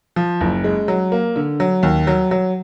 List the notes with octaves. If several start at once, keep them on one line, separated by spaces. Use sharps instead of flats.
F3
F#1
G#3
F#3
A#3
D3
F#3
D#2
F#3
F#3